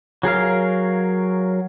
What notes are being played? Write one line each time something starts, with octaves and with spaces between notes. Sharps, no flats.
F#3 G#4 A#4 F5